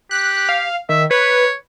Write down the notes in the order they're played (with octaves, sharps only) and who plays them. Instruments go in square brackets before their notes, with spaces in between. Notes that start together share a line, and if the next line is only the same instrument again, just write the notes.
[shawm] G4 [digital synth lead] F#6
[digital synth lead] F5
[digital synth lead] D#3 [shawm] E5
[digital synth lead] B4 [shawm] C#5